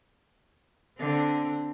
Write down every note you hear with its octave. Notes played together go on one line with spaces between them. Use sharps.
D3 C4